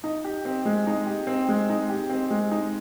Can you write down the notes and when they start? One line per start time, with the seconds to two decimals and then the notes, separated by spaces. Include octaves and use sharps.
0.04 D#4
0.24 G4
0.45 C4
0.66 G#3
0.87 D#4
1.06 G4
1.27 C4
1.49 G#3
1.69 D#4
1.89 G4
2.09 C4
2.31 G#3
2.51 D#4